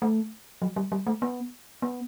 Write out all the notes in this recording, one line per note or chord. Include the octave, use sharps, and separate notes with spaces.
A3
F#3
G3
G3
A3
B3
B3